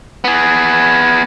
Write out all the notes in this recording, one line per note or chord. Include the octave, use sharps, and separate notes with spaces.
B3 G#4